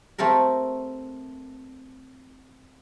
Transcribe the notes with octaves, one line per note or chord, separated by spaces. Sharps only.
A3 C4 A4 A#4